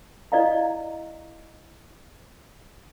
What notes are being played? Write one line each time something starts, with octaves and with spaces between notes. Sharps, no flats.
E4 D5 D#5 F5 A#5